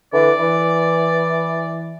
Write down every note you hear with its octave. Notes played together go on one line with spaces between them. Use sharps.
D3 E3 D5
E3